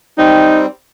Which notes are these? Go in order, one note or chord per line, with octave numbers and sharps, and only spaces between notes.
G3 C4 D#4